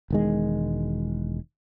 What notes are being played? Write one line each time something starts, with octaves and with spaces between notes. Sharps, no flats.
E1 D#3 G#3